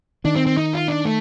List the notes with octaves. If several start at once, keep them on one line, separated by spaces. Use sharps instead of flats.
D#3 D4
C4
C4
D#4
F4
D4
A3